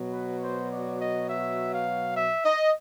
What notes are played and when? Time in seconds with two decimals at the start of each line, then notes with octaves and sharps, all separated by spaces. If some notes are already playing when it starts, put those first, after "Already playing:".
Already playing: B2 F#3
0.11 B4
0.41 C5
0.70 D5
0.99 D#5
1.28 E5
1.72 F5
2.15 E5
2.45 D#5